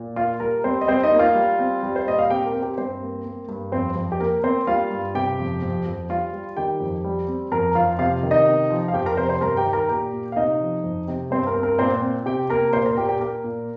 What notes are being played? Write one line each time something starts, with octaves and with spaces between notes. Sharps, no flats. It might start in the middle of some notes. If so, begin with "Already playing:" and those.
Already playing: A#2
A#3 F4 F5
G3 A#4
G3 C4 C5
D#5
G3 C4 C5
D#4 D#5
A#3
F4 F5
G3
C4
G3
C5
A#2 D#5
F5
C4 G4 G5
A#4
C4
G4
G2 C4 C5
A#3
A#3
G2
F2 C4 C5
F2
G4
A#3 A#4
A#3 C4 C5
G3 F4 F5
G2
C3 G4 G5
F2
F2
F2
G3 F4 F5
G3
D#3 G4 G5
F2
G3
C4
F2 A#4 A#5
F2 F4 F5
C3 F4 F5
D#3
D#4 D#5
C3
F3
F5
F2 G4 G5
A#4 A#5
C3 C5 C6
C5 C6
G2 A#4 A#5
G4 G5
D#3
A#4 A#5
A#2 G4 G5
A#2
F5
C3 D#4 D#5
F3
F2
C3
G2 C4 C5
A#4
C4
A#4
A#2 C4 C5
C4
C3 G4 G5
A#3 A#4 A#5
A#2 C5 C6
A#4 A#5
A#2 G4 G5
G4 G5
A#3 A#4
A#2